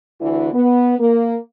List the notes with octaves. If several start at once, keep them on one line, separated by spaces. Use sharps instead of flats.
D2 E3
B3
A#3